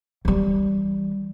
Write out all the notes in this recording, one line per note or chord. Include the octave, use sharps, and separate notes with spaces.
E3 G3